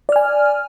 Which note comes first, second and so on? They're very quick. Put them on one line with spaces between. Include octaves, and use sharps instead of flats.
D5 F6 G#5